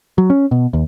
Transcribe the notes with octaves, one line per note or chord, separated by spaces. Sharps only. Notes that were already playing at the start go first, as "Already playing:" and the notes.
F#3
C#4
B2
D#2